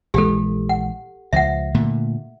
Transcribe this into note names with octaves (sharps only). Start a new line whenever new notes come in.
A#1 E3 G#3 G4 A4
F#5
C#2 F3 E5 F#5
A#2 D3 A3